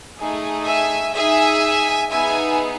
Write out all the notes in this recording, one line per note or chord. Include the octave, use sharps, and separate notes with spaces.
A3 D#4 G#4
E5 G#5
D#4 G#4 E5 G#5
B3 D#4 G#4 E5 G#5